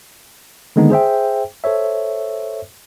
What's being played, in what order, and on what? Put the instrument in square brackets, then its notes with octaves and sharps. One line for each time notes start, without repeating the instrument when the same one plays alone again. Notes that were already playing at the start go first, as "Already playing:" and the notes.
[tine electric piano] D3 D#3 G#3 A#3 B3 D#4
G#4 C5 E5 G5
A4 C5 C#5 E5